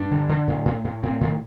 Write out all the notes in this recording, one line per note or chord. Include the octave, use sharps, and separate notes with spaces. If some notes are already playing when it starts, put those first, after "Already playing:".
Already playing: G2 D4
D3
D3
A2
A2
A2
A2 C4
A2 D#3